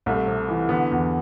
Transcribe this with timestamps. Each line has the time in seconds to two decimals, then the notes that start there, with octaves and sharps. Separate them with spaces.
0.06 C2 A3
0.27 C3
0.48 E3
0.69 D3 B3
0.91 E2